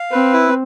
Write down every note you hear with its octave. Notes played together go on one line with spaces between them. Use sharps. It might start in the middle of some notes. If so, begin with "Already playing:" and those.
Already playing: F5
C4 B4
E4